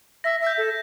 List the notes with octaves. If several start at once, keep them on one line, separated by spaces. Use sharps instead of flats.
E5 A#6
E5
G6
A4